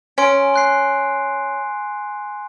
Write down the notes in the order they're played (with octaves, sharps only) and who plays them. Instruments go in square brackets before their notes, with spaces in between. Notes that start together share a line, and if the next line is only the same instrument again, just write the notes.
[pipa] C#4 [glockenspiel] G#5 C6 D7
[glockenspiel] C6 F#6 C7